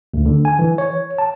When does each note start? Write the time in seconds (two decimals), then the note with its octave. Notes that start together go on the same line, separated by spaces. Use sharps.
0.14 D2
0.26 D3
0.45 G#5
0.59 E3
0.78 C#5
1.18 A5